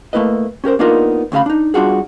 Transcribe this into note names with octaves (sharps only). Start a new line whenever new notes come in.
A3 A#3 E4 B4 D#5
C#4 G4 A#4 C5
A#3 B3 D4 D#4 F4 A#4
D2 C#3 F4 F5 B5
D4 D#4
G3 D4 F4 F#4 G#4